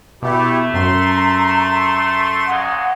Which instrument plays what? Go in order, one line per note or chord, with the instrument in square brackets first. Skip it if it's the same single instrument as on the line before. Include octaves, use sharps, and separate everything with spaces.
[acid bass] B2 [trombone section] A3 [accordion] E4 G4
[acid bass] F#2 [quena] A#5 [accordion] C6
[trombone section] A#2 F#3 G#3 [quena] F#5